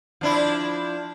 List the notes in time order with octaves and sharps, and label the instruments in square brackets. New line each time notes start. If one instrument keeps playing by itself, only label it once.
[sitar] F3 D4 E4